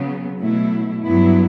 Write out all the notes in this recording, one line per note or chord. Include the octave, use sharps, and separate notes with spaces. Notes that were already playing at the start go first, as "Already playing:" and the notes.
Already playing: C#3 F#3 B3
B2 F#3 A3 E4
G2 F#3 B3 E4